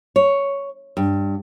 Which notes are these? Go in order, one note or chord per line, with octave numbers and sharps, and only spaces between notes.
C#5
G2